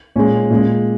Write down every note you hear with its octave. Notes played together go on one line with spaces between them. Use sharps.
A#2 G#3 C#4
A#2 G#3